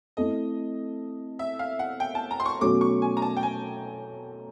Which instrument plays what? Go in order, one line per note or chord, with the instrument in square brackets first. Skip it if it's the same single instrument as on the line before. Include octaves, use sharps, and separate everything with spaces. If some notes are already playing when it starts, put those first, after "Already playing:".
[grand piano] A3 C4 E4 A4 [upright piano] D#5
[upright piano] E5
F5
F#5
G5
A5
A#5
C6
C#6
[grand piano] B2 F#3 A3 C#4 F#4 [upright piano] D6
[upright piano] C#6
G#5
A#5
A5
G5
G#5